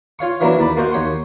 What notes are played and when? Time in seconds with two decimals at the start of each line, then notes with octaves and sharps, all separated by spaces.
0.19 F4 C#5 F5 C#6
0.41 E3 F#3 A#3 D4 E4 A#4
0.59 D#2 D5 B5
0.77 A#3 F#4 C5 D#5 F5
0.91 D#2 C#5 F#5 C6